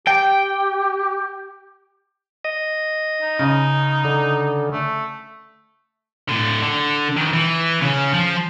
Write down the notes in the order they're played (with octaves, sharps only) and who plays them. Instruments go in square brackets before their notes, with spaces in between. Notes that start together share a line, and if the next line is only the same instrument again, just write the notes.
[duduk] G4 [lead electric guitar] G5
[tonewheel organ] D#5
[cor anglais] D#4
[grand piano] C#3 [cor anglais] D#4
[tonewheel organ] D3
[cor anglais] A3
[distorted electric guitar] A2 D3
D3
D#3 E3
E3
C#3 C#4
F3